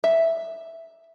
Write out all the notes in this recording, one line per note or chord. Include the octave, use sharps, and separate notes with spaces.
E5